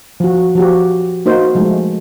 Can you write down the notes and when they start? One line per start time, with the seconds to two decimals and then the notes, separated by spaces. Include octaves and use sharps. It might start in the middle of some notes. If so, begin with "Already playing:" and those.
0.20 F3 F#4
0.55 F3 F#4 G4
1.26 A#3 D#4 F#4 C5
1.55 F3 G#3 A3